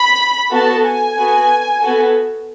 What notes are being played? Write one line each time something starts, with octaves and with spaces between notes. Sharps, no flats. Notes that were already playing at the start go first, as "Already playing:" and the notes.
Already playing: B5
B3 F#4 A4 A5
G#5
B3 F#4 A4
B3 F#4 A4